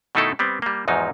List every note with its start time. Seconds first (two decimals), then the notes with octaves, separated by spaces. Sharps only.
0.15 B2 D#3 A3 D#4 E4 A4
0.39 G3 B3 C4
0.62 G3 A#3
0.88 E2 G#2 F3 F#3 D#4